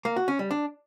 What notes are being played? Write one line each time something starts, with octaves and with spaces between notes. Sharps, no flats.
A#3
F#4
C#4
G3
D4